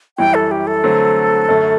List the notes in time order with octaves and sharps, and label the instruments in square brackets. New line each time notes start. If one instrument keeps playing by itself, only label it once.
[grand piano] F#2 E3 G3 [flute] G5
[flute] A4
G4
A4
[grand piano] D3 F#3 A3 C4
F#2 D3 A3